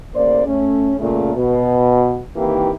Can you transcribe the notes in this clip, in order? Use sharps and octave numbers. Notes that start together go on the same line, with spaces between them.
A2 C#3 A#3 C5 D5
A3 C#4
A#2 C#3 A3
B2
C3 D#3 E3 A#3 E4 G4